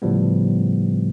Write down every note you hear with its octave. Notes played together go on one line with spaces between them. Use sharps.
A2 C#3 F3 G3 B3